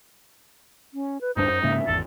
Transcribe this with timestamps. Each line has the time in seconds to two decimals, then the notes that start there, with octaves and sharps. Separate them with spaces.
0.94 C#4
1.21 B4
1.37 D1 G2 D4 D#4 C5
1.50 F#2
1.63 G#2 C#3 A#3 E5
1.87 G#1 E2 A4